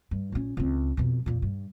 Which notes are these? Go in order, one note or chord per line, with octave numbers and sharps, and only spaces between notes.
G2
A#1 C#4
C#2 C4
F2 B2
F2 A#2
G2